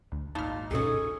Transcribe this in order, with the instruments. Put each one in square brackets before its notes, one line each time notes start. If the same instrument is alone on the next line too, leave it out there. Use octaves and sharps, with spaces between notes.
[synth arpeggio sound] D2
[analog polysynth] G#1 D#4 [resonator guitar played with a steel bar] A#2 [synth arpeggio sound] A5 B5 F6
[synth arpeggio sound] D2 G2 B2 [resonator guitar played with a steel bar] C#4 G#4 [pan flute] A4